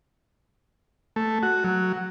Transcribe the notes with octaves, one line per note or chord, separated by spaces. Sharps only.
A3
F#4
F#3